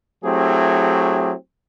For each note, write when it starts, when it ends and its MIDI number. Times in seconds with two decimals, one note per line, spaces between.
0.24 1.32 54
0.24 1.32 57
0.24 1.32 60
0.24 1.32 64
0.24 1.32 67
0.24 1.32 68